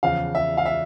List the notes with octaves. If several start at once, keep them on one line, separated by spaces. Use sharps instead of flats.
E2 C#3 F3 F5
E5
F5
E5